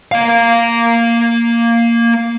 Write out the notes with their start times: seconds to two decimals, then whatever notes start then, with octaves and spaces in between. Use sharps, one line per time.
0.12 A#3 F5